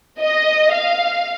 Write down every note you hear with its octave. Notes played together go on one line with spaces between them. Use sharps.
D#5
F5